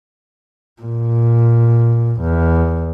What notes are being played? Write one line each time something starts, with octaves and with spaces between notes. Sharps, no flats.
A#2
E2